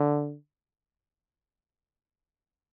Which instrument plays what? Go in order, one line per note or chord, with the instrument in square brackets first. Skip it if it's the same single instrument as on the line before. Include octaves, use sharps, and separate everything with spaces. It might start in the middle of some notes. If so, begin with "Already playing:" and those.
Already playing: [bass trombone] D3